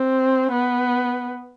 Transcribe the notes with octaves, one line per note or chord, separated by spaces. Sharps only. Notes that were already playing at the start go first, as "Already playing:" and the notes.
Already playing: C4
B3